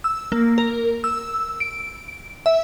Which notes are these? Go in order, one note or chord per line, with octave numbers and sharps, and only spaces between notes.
E6
A#3
A#4
E6
D7
E5